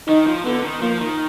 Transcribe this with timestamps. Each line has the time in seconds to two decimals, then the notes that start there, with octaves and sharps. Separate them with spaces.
0.08 D#3 D#4
0.27 F3
0.45 D3 B3
0.63 D#3
0.82 F3 A#3
1.00 D#3